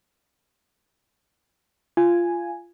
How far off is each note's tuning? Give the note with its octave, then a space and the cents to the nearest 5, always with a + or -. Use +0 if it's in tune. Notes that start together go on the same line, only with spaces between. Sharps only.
F4 -15 G#5 +0